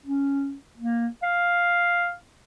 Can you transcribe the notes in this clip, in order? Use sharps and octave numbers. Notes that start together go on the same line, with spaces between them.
C#4
A#3
F5